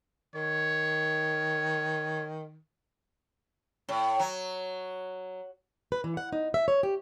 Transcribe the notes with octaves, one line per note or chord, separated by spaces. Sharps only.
D#3 C#5
A2
F#3
B4
E3
F#5
D#4
E5
C#5
G4